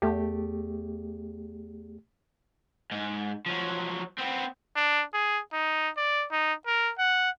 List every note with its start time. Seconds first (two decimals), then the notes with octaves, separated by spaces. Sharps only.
0.02 E2 A3 G4
2.92 G#2
3.46 F3 F#3
4.18 B3 C4
4.76 D4
5.14 G#4
5.53 D#4
5.98 D5
6.32 D#4
6.67 A#4
6.99 F#5